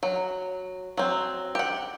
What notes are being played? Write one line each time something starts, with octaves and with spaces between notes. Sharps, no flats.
F#3
F#3 C4
G4 F#5